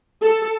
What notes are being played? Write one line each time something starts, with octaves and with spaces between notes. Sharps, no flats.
A4